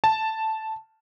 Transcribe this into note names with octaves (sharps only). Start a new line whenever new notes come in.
A5